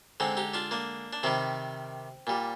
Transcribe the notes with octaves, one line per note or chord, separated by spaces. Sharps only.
D3 G#3 C4 D#4
D#4 G4
D4 F4
A#3 D4
D4
C3 D#3 G3 C4
A#2 G3